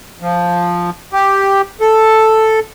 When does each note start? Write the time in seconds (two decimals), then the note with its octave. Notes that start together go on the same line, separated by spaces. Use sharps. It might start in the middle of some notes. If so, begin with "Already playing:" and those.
0.22 F3
1.13 G4
1.81 A4